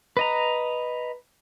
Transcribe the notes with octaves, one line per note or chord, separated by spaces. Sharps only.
B4 D#5 A#5